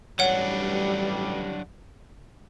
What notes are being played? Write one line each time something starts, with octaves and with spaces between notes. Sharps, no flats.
A1 G2 F#3 G3 D4 C#5 F#5